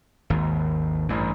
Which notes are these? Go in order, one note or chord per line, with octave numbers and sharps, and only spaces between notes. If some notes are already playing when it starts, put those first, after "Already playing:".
G#1 D#2
A1 G2 E3